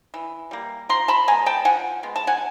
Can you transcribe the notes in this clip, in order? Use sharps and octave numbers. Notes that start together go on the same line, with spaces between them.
E3
G3 A#3
F3 A#5 C6
A5 B5
G#3 B3 G#5 A#5
G5 A5
F3 F#5 G#5
G#3 B3
A5
F#5 G#5